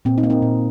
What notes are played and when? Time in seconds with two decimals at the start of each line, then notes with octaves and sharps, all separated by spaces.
0.05 A#2 C4
0.18 C4 D#4
0.23 A#3
0.30 C4 D#4
0.42 A#2